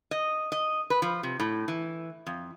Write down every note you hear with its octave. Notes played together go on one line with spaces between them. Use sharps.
D#5
D#5
B4
F3
C3
A2
E3
F2